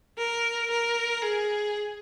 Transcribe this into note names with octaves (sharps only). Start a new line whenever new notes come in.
A#4
A#4
G#4